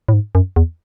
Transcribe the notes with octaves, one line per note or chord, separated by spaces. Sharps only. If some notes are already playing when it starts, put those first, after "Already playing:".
A2
G#2
F#2
E2